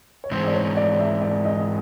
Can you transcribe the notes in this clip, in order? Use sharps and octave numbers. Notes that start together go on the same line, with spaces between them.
C#5
G#2 E3 G#3 C4 C5
D5
C#5
D5
E5
D5
D#5